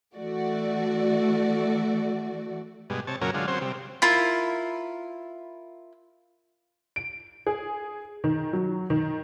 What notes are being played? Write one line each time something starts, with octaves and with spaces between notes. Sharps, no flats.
E3 A3 F#4 D5
G2 B2 G#3
C3 C#5 A5
F#2 A#2 C#3 F#3 C#4 A#4
D3 F#3 G#3 F4
F#3 C4 C#4 C5
C3 G3
E4 F4 A#4
D7
G#4
D#3
F#3
D#3